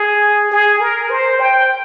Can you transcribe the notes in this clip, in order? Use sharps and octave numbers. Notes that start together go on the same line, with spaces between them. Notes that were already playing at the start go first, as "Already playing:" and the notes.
Already playing: G#4
G#4
A#4
C5
G5